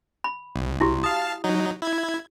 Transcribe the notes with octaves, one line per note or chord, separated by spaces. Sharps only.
B5
C2
E4 F#4 G4
F5 A5 D#6
F#3 D#4
E4 G#6